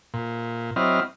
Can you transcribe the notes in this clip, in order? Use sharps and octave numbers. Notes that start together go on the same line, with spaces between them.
A#2
F#3 C4 E4 D#5 F6